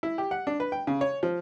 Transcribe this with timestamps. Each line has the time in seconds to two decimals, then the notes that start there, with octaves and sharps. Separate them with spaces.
0.03 E4
0.18 G4
0.31 F#5
0.47 D4
0.60 B4
0.72 G5
0.87 C#3
1.01 C#5
1.23 F3